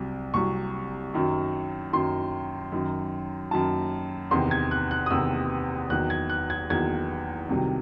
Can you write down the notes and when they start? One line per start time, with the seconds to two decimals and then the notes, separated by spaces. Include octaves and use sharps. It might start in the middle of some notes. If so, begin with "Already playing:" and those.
Already playing: C2 C3 F#3
0.34 C2 C3 F#3 C#6
1.14 F#2 D#3 F#3
1.93 F#2 D#3 F#3 C6
2.72 F#2 D#3 F#3
3.51 F#2 D#3 F#3 A5
4.31 E2 C3 D#3 C6
4.51 G#6
4.71 F#6
4.91 F#6
5.06 D#6
5.10 E2 C3 D#3 E6
5.90 E2 D#3 F#3 F#6
6.10 G#6
6.30 F#6
6.50 G#6
6.70 E2 D#3 F#3 G#6
7.49 C2 C3 D#3 F#3